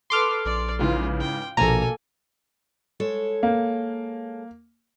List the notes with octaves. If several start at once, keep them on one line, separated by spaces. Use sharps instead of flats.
A4 B4 C6 D6 F6
A#1 D5
G#2 C#3 E3 F4
G5
A#1 B2 A#3 A4 G#5 A#5
G#3 A4 C#5
A#3